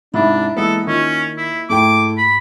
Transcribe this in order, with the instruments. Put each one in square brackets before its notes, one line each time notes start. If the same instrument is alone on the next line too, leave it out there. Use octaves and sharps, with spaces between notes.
[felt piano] G#2 C3 [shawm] D4 [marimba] E4 E5 B5
[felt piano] E3 G#3 B3 [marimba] A#3 D#6 E6 [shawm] A4
[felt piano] D#3 [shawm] C#4 [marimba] F4 D#5 C#6
[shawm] E4
[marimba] G#2 [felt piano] A3 E4 G5 [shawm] D6
[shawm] B5